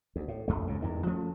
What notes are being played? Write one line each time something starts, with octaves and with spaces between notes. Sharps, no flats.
D2
A2
D#1 A#1 F2 A3
C#2 G#2 C#3
E2 G2 D#3
F3 A3 C#4